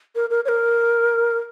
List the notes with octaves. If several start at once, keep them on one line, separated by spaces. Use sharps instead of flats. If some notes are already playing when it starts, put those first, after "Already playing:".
A#4
A#4
C#5
A#4